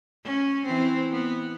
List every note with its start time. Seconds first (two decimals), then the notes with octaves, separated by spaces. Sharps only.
0.25 C#4
0.65 E3 C4
1.12 B3